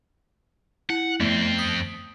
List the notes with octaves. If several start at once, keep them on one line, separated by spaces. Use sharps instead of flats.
E4 F#5
F2 A3 B3 C4
D#6 B6 D7